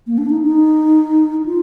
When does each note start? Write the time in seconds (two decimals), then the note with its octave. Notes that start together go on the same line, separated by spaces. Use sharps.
0.07 A#3
0.18 D4
0.30 D#4
0.42 D#4
1.46 F4